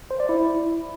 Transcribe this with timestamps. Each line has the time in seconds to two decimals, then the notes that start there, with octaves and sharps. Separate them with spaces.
0.11 C5
0.20 D5
0.29 E4